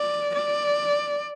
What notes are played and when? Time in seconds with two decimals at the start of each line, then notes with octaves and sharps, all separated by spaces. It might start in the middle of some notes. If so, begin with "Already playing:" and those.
Already playing: D5
0.35 D5